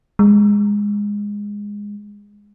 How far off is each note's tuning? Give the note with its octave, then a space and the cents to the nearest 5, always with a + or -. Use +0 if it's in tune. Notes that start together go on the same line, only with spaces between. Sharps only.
G#3 -15